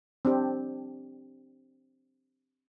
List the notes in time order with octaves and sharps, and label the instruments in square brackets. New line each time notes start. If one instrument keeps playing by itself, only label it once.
[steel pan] C4 D4 G4